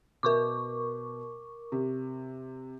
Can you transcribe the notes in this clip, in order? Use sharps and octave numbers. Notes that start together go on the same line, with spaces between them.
B2 A#4 C#6 D6
C3